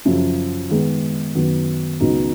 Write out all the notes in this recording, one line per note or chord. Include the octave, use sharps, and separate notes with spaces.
F#2 C#3 F3
D#3 G#3 B3
F#2 D#3 F#3 B3
C#2 B2 F#3 B3 D#4